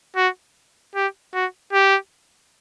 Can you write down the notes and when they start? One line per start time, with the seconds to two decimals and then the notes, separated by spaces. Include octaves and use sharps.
0.16 F#4
0.95 G4
1.34 F#4
1.73 G4